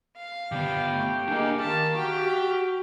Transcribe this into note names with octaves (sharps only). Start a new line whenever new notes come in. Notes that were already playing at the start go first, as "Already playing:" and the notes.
F5
D3 B3 G4
A3
A#3 D4 G#4 D#5
D#3 G4 F5 A5
F#4 G5